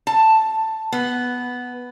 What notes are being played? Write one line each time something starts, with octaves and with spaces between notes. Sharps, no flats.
A5
B3